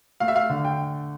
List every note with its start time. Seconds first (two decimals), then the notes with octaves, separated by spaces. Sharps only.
0.20 A3 F5
0.28 E5
0.36 F5
0.50 D3
0.65 G5